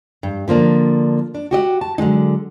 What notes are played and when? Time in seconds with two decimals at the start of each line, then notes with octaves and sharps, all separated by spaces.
0.23 G2
0.48 D3 F3 A#3 D4
1.35 D4
1.51 F#4 G4 D#5 F#5
1.81 A5
1.98 D3 F#3 G#3 D#4